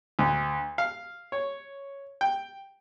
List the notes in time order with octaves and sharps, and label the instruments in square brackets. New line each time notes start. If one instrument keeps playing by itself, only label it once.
[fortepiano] D2
F5
C#5
G5